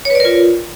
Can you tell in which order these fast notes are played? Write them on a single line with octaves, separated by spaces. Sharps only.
C#5 B4 D5 A#4 F4